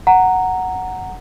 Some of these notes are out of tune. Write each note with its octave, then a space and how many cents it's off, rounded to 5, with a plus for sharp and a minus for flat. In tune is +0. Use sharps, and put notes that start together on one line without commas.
F#5 +0 A#5 -10